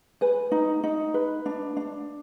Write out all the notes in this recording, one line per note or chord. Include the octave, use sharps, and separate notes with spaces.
B4 G#5
D#4
D#4
B4
D4
D4